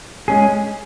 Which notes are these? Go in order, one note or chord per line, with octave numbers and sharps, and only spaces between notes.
G#3 C#4 G#4